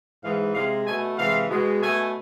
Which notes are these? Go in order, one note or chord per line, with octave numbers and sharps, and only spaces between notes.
G#2 E3 G#3 F5
C3 G#3 F5
B2 A3 G#5
C3 E3 G#3 F5
B2 G#3
B2 A3 G#5